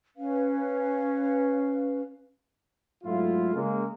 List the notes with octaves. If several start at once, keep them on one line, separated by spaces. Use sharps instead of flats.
C#4 B4 F5
G#2 F#3 A3 E4 F4
C#3 G#3 A#3